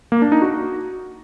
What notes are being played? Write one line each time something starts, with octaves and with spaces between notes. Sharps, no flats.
A#3
D4
D#4
F#4